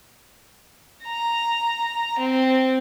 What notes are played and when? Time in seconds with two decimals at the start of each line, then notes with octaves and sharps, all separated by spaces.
1.04 A#5
2.19 C4